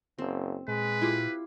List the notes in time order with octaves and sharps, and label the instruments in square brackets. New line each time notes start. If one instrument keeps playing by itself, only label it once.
[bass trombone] F#1 [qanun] C4
[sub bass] A#2 [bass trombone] G#3 [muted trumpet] B4
[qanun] E4 F4 G4